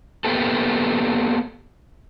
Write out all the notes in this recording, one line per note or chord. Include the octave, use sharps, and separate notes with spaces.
A#3 B3 G4 A4